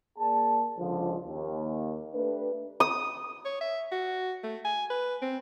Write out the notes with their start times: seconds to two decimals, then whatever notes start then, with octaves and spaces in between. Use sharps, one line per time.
0.17 A#3 G#4 D5 A5
0.78 C#2 D3 F3
1.24 D#2
2.14 A3 D4 G4 B4
2.80 D#6
3.45 C#5
3.61 E5
3.92 F#4
4.43 A3
4.65 G#5
4.90 B4
5.22 C4